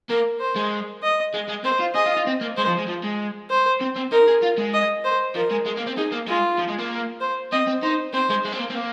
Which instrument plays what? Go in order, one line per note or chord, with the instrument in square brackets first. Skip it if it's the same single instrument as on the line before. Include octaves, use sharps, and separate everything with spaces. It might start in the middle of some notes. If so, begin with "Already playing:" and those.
[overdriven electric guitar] A#3 [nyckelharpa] A#4
[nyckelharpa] C5
[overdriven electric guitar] G#3
[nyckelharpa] D#5
[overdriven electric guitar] G#3
G#3
[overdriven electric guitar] C4 [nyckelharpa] C5
[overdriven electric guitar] F4
[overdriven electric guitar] G#4 [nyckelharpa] D#5
[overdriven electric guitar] F4
F4
C4
A#3
[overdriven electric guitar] G#3 [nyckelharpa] C5
[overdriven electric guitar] F3
G#3
F3
G#3
[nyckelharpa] C5
[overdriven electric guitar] C4
C4
[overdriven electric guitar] D#4 [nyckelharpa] A#4
[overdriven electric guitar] G#4
F4
G#3
[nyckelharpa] D#5
C5
[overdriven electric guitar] F3 [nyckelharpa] A#4
[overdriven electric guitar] G#3
G#3
A#3
C4
[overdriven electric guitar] D#4 [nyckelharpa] G#4
[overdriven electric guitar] A#3
[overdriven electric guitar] G#3 [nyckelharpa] F4
[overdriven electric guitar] F3
G#3
A#3
[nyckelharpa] C5
[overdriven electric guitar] C4 [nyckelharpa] D#5
[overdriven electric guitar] C4
[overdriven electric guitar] D#4 [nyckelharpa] C5
[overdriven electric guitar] C4 [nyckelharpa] C5
[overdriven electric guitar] G#3
G#3
C4
A#3
C4
A#3